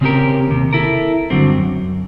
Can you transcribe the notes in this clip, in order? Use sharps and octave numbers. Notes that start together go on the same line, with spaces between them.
C#3 C4 C#4 F#4 G4 A#4
D#2 C3
E4 A4 A#4
G2 D3 F#3 C4
F#2